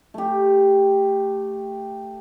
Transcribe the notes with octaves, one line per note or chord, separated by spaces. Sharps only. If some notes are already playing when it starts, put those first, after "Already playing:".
A3 G4